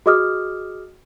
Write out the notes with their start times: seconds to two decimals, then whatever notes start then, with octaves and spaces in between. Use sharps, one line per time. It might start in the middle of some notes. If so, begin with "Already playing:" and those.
0.06 F#4 G#4 D#5 D6 D#6 F6